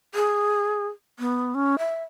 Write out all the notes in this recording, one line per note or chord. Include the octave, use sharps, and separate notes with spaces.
G#4
B3
C#4
E5